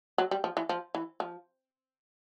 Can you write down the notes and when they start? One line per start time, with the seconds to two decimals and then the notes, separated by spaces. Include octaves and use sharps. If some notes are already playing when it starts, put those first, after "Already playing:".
0.18 F#3
0.31 G3
0.44 F3
0.57 E3
0.69 F3
0.95 E3
1.20 F3